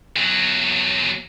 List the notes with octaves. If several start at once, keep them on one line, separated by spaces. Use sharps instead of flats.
E2 F#3